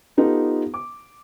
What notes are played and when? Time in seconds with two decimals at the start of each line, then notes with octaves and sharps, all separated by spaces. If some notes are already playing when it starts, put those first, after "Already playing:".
0.17 B3 D#4 F4 G4 A4 B4
0.74 D6